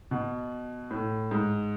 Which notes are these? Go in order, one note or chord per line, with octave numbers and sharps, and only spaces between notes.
B2
A2
G#2